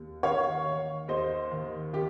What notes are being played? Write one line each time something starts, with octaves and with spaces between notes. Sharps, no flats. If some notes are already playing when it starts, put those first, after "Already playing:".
Already playing: D#2
D#3 C#5 F5
D#3
D#2 C5 D#5
D#3
D#3 G4